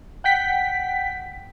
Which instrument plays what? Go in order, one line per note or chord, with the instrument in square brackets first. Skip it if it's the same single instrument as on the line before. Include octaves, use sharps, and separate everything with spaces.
[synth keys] F#5 G5 B6